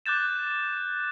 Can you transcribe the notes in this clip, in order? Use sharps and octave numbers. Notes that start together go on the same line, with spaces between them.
D6 F#6 G6 A6 E7